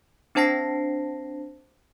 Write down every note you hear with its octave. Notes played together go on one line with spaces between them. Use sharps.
C4 D4 C5 A5 A#6 C7